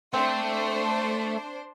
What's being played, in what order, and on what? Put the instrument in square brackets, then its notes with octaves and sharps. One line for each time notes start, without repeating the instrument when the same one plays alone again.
[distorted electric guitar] A3 [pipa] C4 [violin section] D4 C5